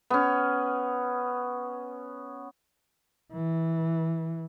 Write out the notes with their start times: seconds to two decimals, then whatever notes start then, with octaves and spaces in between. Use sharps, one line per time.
0.10 B3 C#4
3.33 E3